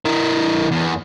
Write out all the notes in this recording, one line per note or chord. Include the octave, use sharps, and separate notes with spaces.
E3 A#4
E2